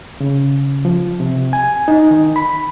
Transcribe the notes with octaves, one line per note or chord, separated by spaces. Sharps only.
C#3
F3
C3
G#5
D#4
D#3
B5